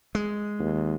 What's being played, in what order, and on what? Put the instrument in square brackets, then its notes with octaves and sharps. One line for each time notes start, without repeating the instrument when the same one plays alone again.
[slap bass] G#3
[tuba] D#2